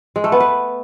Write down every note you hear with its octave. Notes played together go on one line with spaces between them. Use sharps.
G#3
A3
B3
B4